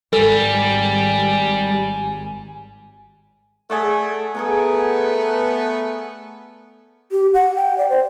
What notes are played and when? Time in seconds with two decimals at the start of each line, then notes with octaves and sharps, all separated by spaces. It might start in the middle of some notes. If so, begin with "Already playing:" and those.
0.13 G#1 G3 A4 G#5
3.70 A3 G#4 D5 F#5
4.35 A3 B3 G#4 A#4 F#5
7.12 G4
7.34 F#5
7.56 G5
7.78 D5
7.89 C5